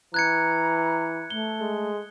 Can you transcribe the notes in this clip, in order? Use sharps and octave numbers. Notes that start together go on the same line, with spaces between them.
E3 A#5 F#6 G#6 C#7
A3 G7
G#3